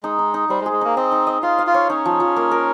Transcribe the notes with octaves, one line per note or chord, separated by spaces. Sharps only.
G#3 D#4
D#4
D#4
G3 C5
G#3
G#4
G#3
A#3 D#4
C4 D#5
D#4
D#5
F4 F5
F5
F4
C#5
C#4 D#4
F3
F3
A#3
A#4